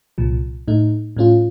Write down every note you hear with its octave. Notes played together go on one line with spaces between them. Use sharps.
C2 A#2 F3
A2 A3 D#4
A2 A3 C#4 F4